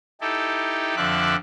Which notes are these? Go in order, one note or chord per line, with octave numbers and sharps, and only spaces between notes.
D#4 E4 G4 A4
F2 D3 F3 D5 E5 F#6